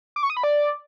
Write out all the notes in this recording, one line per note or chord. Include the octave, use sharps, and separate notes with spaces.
D6
C#6
D#6
B5
D5